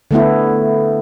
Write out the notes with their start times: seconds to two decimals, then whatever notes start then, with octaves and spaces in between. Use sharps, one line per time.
0.11 D3 A3 B3 E4